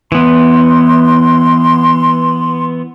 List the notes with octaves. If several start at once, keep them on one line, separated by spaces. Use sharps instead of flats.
E3 B3 C6